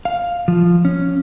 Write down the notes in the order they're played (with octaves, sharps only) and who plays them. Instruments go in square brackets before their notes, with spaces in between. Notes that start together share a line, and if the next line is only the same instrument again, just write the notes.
[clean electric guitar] F5
F3
C#4